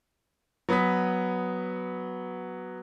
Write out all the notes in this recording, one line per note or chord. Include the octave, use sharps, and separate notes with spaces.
F#3 B3 B5 D#6 B6